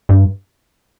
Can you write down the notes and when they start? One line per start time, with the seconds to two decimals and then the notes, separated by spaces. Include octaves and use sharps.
0.09 G2